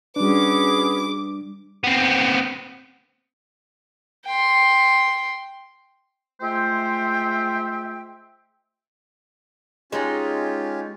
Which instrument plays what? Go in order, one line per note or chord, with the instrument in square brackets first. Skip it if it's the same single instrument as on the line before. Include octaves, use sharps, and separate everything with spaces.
[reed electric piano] G3 D4 [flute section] C#4 F#4 G#4 [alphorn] B4 [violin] D6
[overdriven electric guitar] B3 C4
[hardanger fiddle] G5 C6
[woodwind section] G#3 A3 F4 C5 E5 G5
[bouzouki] G#3 D#4 [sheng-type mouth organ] C#4 F4 G4